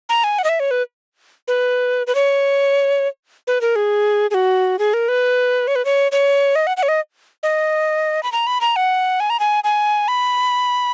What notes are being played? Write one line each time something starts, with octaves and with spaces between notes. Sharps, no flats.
A#5
G#5
F#5
D#5
E5
C#5
B4
B4
B4
C#5
B4
A#4
G#4
G#4
F#4
G#4
A#4
B4
C#5
B4
C#5
C#5
D#5
F#5
F#5
C#5
D#5
D#5
B5
A#5
B5
A#5
F#5
G#5
A#5
G#5
G#5
B5